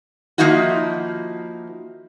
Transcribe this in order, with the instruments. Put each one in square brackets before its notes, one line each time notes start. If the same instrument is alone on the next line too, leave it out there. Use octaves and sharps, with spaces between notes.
[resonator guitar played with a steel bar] D#3 F3 A#3 D#4 E4 F#4